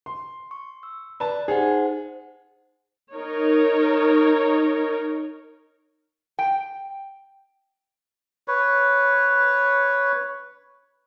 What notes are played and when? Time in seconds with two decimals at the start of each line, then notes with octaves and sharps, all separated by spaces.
0.06 C6
0.51 C#6
0.83 E6
1.20 B4 D5 A5
1.48 D#4 G#4 C5 F#5
3.14 D#4 A#4 C#5
6.39 G5
8.48 B4 C#5